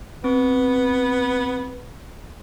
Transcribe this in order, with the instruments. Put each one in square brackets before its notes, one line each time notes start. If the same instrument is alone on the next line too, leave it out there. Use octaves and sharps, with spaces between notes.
[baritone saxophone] B3 [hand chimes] C4